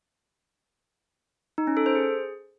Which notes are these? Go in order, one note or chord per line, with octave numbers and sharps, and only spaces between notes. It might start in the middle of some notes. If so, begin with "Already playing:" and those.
D#4
C#4
A4
C5
G#4